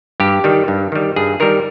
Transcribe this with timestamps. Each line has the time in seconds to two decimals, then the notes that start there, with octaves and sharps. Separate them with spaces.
0.20 G2 G4
0.44 D#3 G3
0.68 G2
0.92 D#3 G3
1.16 G2 G#4
1.40 D#3 G3 A#4